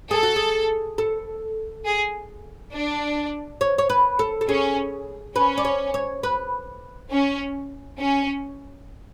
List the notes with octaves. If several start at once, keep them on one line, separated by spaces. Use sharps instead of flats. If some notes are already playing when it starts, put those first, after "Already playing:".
G#4 A4
F#4
G#4
A4
G#4
D4
C#5
C#5
B4
A4
A4
C#4 G#4
C#4 B4
D5
C#5
C#5
B4
C#4
C#4